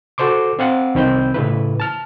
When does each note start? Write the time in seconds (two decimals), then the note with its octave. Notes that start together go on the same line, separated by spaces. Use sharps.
0.18 F#4 A4 C5 C6 D6
0.59 C4 F5 F#5
0.95 C2 D#3 C4 B5 G6
1.34 A2 C#3 E4 B4
1.80 A5 F6